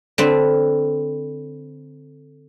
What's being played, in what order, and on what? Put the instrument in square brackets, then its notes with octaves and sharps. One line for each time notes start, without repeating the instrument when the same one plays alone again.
[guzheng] D3 C4 B4